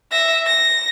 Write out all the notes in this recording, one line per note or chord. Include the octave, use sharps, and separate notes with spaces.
E5 A#6
A#6